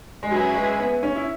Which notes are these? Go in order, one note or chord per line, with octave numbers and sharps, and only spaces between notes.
G#3
F#3 C#4 G#4 B4 E5 G#5
G#3
B3
C#4
E4